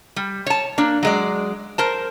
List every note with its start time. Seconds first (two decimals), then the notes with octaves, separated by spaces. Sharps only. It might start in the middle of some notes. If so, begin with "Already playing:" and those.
0.16 G3
0.46 C#5 A5
0.78 A#3 D4
1.03 F#3 G#3 D5
1.78 A#4 C5 A5